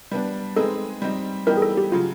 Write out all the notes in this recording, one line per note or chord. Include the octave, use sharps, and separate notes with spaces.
G3 B3 D4
G#3 C4 D#4 G#4 A4 B4
G3 C4 D#4
E3 G3 B3 D#4 G4 A#4
G#4
A4
G4
C#3 F#3 F4